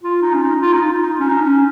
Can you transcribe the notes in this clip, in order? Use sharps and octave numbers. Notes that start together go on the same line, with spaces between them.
F4
D#4
C#4
D#4
F4
D#4
F4
D#4
C#4
D#4
C#4